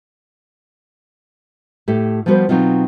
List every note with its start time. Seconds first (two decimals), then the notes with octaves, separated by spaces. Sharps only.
1.88 A2 G4 A4
2.26 F3 G3 B3 F#4 A#4 C5
2.49 B2 F#3 C4 D#4 F4